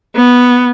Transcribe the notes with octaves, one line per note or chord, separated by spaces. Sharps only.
B3